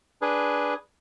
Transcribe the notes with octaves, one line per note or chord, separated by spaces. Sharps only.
D4 G#4 B4